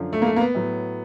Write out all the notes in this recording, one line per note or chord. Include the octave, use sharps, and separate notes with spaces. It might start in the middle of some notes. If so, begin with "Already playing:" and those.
Already playing: F#2 D3 F3
A3
A#3
A3
A#3
B3
A2 F#3